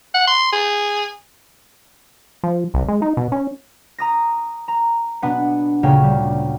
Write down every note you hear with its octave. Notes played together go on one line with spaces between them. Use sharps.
F#5
C6
G#4
F3
C2
G#3
D#4
B2
C#4
A#5 D#6 A#6
A#5
B2 B3 D4 F#5
D2 A#2 C#3 A#3 C#5 G5
G3